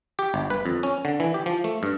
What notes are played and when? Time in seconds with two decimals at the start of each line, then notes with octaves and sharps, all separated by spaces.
0.19 G4
0.34 G1
0.50 B4
0.66 F2
0.83 C#4
1.05 D3
1.20 E3
1.34 G4
1.46 F3
1.64 A3
1.83 G2